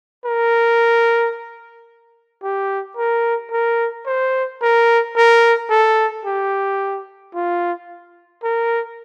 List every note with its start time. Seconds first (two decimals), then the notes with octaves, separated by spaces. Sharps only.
0.25 A#4
2.43 G4
2.97 A#4
3.51 A#4
4.06 C5
4.62 A#4
5.16 A#4
5.70 A4
6.25 G4
7.34 F4
8.43 A#4